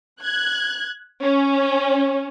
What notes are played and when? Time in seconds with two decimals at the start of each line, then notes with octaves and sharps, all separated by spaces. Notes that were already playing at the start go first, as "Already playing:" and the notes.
0.21 F#6 G#6
1.22 C#4